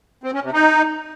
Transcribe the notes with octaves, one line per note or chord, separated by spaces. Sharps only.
C4
C#4
C3
D#4